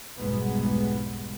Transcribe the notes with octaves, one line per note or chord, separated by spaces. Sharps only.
F1 B1 G#2 G3 G#3 B3